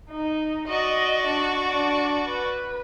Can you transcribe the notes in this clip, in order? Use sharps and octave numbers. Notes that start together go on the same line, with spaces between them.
D#4
F#4 D5 D#5
D4
D4
B4